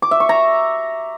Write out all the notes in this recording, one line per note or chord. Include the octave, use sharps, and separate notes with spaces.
D6
E5
C#6
A#5